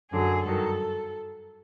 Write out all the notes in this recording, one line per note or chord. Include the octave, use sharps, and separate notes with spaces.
F#2 D3 F#3 G#4
G2 D#3 F#3 A4